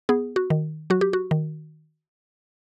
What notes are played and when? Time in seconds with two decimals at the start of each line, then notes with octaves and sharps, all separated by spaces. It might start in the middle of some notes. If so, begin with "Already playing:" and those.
0.09 B3 G#4
0.36 F#4
0.50 D#3
0.90 F#3 F#4
1.01 G4
1.13 F#4
1.31 D#3